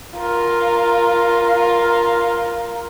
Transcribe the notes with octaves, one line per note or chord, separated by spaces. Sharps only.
F4 A#4